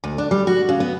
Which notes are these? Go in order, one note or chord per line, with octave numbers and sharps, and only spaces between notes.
D2
D4
G3
F#4
C#3
B3